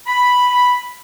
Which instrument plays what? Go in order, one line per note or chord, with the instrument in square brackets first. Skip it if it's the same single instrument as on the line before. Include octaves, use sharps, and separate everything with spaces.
[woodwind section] B5